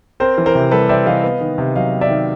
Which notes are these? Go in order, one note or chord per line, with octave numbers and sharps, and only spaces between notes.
C4 A#4 C5
E3
A#4 C5
C3
G3 A4 B4
C4 D5 E5
E3 D#5 F5
B3
D#3
C3
F#3 D#5 F5
B3
D5 E5
D#3